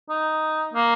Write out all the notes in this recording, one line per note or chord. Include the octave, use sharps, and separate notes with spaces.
D#4
A#3